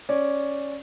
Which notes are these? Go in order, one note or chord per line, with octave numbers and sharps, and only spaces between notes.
C#4 D5